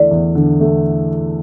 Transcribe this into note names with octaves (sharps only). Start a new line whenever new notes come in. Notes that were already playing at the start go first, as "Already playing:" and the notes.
Already playing: E2 D3 A3 E4 D5
E2
D3
A3